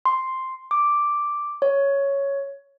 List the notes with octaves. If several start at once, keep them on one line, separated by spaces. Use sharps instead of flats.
C6
D6
C#5